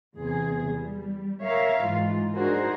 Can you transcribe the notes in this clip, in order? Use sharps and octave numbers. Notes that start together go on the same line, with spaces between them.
E2 C3 G#4
G3
A#4 C#5 E5 F5
G#2 E3 F4
D4 D#4 F#4 G#4 A#4 C5